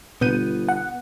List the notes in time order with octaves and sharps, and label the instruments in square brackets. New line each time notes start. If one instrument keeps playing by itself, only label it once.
[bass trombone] G1 [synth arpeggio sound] B2 G6 D#7 [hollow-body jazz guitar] B3
[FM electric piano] F#5